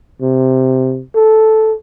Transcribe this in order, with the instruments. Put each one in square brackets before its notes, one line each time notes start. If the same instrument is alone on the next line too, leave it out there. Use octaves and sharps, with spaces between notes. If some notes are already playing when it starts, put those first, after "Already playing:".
[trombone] C3
A4